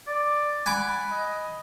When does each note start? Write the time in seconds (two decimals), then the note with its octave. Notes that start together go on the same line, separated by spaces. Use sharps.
0.07 D5
0.66 F#5 G#5 B5 D6
1.11 D#5